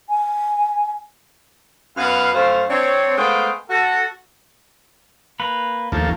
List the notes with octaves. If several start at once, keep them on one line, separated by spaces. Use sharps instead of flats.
G#5
F#2 B3 B4 F5
F#2 A3 C5 F5
C4 D4 C#5
G#3 A3 B3 C5 F5 G5
F#4 A4
A#3 B4
D#2 F3 A3 A#3